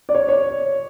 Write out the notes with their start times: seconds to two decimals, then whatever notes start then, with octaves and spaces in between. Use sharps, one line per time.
0.09 D5
0.15 C#5
0.29 C#5